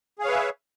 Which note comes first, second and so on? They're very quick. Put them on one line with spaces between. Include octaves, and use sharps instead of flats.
G#4 F5 C#5 B4 E5